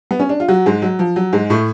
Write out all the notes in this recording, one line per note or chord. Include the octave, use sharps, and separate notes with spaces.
B3
C#4
D4
F4
F#3 F#4
G#2 G#3
F#3
F3
F#3
G#2 G#3
A2 A3